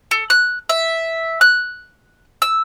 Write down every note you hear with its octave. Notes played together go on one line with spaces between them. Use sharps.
A4
F#6
E5
F#6
E6